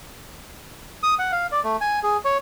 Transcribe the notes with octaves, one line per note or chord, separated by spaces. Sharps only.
D#6
F#5
F5
D5
A3
G#5
G#4
C#5